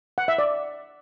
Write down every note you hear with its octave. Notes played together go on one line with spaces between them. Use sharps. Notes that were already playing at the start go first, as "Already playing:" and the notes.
F#5
E5
D5